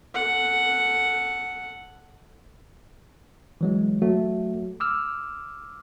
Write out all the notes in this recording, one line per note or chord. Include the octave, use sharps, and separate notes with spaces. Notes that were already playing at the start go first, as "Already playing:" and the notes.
A4 F#5
E3 F#3 G#3
F#3 A3 F#4
D6 E6 F6